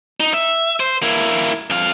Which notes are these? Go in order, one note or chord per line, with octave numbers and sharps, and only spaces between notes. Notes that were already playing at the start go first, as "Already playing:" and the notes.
D#4
E5
C5
A#3 E4
F2 F5